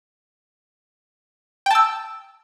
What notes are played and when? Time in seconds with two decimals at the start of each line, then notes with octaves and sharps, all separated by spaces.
1.66 G5
1.71 A5
1.75 E6